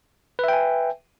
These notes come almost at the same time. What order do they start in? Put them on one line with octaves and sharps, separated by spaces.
B4 E5 G5 G#5